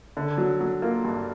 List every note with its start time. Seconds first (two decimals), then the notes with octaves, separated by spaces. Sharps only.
0.17 D3
0.38 F#3
0.61 F#3
0.82 A#3 F4
1.05 G2